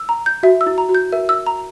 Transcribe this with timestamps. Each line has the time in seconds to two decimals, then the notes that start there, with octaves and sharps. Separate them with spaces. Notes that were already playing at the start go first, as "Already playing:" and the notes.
Already playing: E6
0.09 A#5
0.26 G6
0.43 F#4 E5
0.61 E6
0.66 E4
0.78 A#5
0.89 F#4
0.95 G6
1.12 A#4 E5
1.29 E6
1.47 A#5